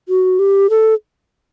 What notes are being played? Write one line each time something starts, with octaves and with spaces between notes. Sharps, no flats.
F#4
G4
A4